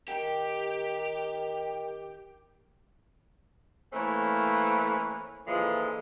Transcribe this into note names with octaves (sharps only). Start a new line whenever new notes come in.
D#3 G4 G5
E3 A3 A#3 C4 C#4
A#2 D3 E3 F3 G#3